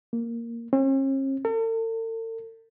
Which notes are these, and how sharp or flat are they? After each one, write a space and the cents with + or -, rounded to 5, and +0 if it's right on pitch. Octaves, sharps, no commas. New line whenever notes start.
A#3 -5
C#4 -45
A4 +45